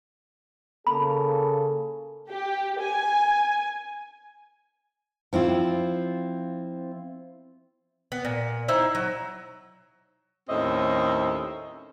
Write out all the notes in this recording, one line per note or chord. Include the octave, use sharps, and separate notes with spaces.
C#3 A#3 A4 B5
G4
G#5
F3 C4 E4 F4
B3
A#2
D#4 E4 C5
F#3
D#2 A2 C4 C#4 D#5 E5